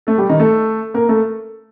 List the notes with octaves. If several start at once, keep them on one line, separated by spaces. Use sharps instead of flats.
A3 A4
G3 G4
D#3 D#4
A3 A4
A#3 A#4
A3 A4